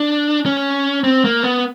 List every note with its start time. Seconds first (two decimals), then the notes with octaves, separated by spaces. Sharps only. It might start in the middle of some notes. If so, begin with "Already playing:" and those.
Already playing: D4
0.46 C#4
1.04 C4
1.25 A#3
1.43 B3